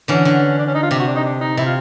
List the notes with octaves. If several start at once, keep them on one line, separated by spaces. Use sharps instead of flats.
D3 E3 C#4
D3
D4
C#4
D#4
F4
C3 G4
F#4
D4
D#4
D4
D#4
C3 E4
F4